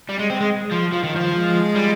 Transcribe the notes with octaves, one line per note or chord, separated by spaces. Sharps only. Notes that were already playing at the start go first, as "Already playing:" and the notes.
G3
G#3
C4
G#3
F3
F3
D#3
F3
G#3
G3